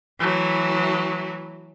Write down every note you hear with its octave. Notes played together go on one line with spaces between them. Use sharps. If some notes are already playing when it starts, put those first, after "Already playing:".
E3 F#3 A3